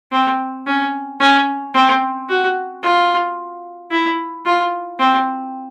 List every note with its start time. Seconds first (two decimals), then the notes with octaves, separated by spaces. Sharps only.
0.11 C4
0.66 C#4
1.20 C#4
1.74 C4
2.28 F#4
2.83 F4
3.91 E4
4.45 F4
4.99 C4